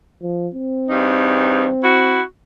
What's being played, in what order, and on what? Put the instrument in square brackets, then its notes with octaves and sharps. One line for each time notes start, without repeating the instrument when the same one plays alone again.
[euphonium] F3
C4
[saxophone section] E2 G2 D#4
E4 F#4